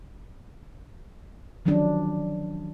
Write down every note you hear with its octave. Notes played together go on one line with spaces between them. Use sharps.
D#3 F3 F#3 C#4 D4